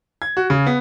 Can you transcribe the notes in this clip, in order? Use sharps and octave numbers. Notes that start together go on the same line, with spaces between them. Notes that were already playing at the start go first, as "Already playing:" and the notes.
G#6
F#4
C#3
B3